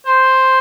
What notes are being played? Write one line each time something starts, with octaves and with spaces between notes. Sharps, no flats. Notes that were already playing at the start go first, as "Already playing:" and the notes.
C5